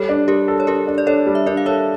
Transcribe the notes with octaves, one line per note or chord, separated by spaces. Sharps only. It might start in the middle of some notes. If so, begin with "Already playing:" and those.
Already playing: G3 A4 C#5
D4
G3 G4 A#4
A4
C#5
D4 G4 A#4
D4
D5
D4 A4 C#5
G3
E5
D4 A#4 D5
F5
A4 C#5 E5